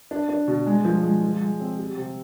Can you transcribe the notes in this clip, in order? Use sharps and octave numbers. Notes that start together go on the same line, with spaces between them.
D4
D4
B2
G#3
F3
G#3
F3
G#3
C4
G3
C3